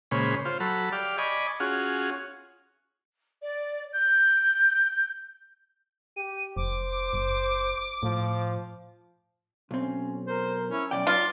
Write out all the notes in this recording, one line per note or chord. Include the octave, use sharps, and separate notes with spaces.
A#2 C#3 G#3 C5 C#5 B5
F4 C5
F#3 A4 B5
G4 D5 F5
D5 D#5 G#5 B5 C#6
C#4 F4 F#4 G#4
D5
G6
G4 D#7
F1 C5 D6
F#1
A2 F3
B1 C4 C#4
A#4 C5
C#4 E4
B1 A#2 C#4 D5 G5
F#3 F4 B4